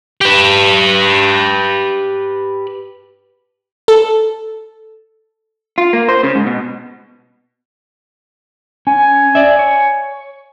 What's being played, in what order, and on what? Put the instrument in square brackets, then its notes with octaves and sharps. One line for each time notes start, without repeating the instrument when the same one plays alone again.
[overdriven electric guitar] G4 B4
[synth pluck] A4
[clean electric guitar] F4
A#3
C5
C#3
G#2
B2
[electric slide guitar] C#4 [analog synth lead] G#5
[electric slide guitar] D5 E5
C#5